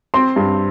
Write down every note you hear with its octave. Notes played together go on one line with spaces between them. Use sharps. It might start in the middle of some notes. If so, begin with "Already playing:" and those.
C4 C6
G2